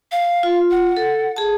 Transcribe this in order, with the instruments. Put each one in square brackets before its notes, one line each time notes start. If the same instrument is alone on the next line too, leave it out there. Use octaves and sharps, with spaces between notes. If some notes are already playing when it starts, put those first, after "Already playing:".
[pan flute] F5
[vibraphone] F4
[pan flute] F#5
[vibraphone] A4
G#4 A5